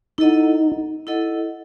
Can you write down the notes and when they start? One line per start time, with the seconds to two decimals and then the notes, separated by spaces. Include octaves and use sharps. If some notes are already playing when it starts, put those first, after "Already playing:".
0.18 D#4 E4 A4 D#5 F#5
1.07 E4 A4 D#5 F#5